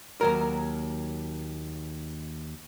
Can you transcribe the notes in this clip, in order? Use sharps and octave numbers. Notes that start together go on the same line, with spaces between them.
D#2 F#3 A#4